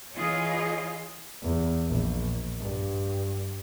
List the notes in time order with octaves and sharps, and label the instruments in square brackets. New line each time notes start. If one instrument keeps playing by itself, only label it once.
[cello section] E3 F4 G#4 C#5 D#5
[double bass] E2
A#1
G2